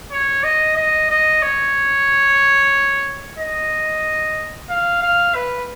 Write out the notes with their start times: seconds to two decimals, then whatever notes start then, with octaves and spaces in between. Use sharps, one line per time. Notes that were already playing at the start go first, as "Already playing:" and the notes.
0.12 C#5
0.44 D#5
0.76 D#5
1.10 D#5
1.42 C#5
3.39 D#5
4.70 F5
5.02 F5
5.35 B4